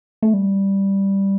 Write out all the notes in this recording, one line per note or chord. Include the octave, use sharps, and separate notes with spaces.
A3
G3